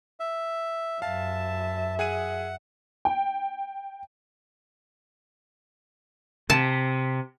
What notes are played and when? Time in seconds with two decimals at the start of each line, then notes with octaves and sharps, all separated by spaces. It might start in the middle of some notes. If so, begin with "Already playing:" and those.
0.20 E5
1.02 F#2 E5 F5 A5
1.99 G#4 F#5 G#5 D#7
3.05 G5
6.50 C3 A5